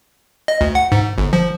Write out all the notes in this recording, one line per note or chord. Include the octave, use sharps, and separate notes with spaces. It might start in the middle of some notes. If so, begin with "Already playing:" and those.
D#5
D2
F#5
G#2
G1
F3